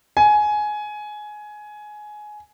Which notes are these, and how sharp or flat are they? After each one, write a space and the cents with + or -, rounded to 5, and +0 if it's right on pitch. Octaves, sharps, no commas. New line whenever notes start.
G#5 +15